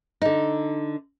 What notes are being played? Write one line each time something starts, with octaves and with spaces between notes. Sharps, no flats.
D3 D#4